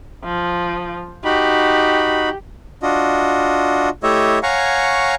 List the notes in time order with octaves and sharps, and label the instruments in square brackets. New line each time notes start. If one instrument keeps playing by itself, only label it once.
[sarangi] F3
[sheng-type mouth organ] D#4 F#4 B5 [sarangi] G4
[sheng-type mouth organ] D4 F4 F#4 D#5
A3 E4 G4 C#5 D#5 E5
C#5 F5 F#5 G#5 A#5 C#6